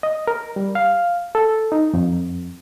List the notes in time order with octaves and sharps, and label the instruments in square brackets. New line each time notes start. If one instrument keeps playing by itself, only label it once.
[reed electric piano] D#5
A#4
G3
F5
A4
D#4
F2